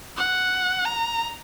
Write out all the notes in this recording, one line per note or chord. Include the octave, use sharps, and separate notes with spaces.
F#5
A#5